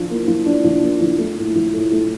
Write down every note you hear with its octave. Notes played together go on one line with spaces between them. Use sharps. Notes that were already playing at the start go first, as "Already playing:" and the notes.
Already playing: F3 D4
A#3
F3
D4
F3
A#3
F3
A3
A2
F3
A2
A3